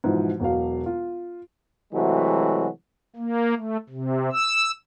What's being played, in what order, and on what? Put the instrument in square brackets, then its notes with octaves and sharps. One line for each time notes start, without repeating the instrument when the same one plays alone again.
[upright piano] G#2 B2 E3 F3
E1 B2 F#3 F5
F4
[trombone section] C3 E3 F#3 G#3 A3 F#4
[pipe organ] A#3
A3
C3
E6